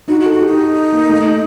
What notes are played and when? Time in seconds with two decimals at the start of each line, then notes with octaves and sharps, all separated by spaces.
0.08 D#4 F#4
0.20 F#4
0.26 A4
0.33 F#4
0.42 D#4 G4
0.92 A#3
1.09 A3